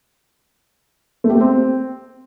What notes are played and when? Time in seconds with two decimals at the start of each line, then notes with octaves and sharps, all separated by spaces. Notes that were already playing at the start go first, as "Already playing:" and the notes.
1.24 A3
1.30 G4
1.35 A3
1.41 C4